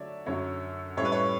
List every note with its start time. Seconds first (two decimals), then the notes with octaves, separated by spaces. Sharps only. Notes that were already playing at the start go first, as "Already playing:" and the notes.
Already playing: D3 F#3 A3 C#5 D5 E5
0.26 F#2 D3 F#3 C#5
0.97 A2 G3 C#4 C#5
1.05 B4
1.12 C#5